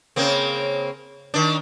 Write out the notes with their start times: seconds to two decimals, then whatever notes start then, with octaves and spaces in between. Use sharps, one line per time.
0.16 C#3 A#3 C4
1.34 D#3 D4